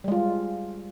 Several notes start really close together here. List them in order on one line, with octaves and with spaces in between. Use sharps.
G3 G#3 F4